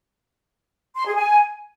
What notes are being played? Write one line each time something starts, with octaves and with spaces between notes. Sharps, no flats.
C6
G#4
G#5